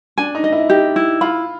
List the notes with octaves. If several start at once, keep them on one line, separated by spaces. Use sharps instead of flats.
D4 G#5
D#4
D#5
E4
D#4 G4
E4
F4 B5